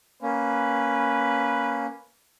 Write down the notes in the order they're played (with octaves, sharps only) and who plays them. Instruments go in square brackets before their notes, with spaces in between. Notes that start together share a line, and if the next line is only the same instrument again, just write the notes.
[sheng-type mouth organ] A#3 C#4 [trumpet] B4